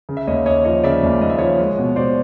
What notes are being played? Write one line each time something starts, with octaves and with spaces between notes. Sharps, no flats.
C#3
E5
D#2 C#5 D#5
D#2 C#5 D#5
F3 C#5 D#5
C#3 D5 E5
D#2
D#2 D#5
E5
F3 C#5 D#5
G#3
B2
B2 C5 D5